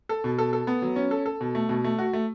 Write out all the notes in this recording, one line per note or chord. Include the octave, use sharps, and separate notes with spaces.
A4
B2
A4
A4
B3
F#3
C#4
A4
A4
B2
A3
B2
A3
F#4
A3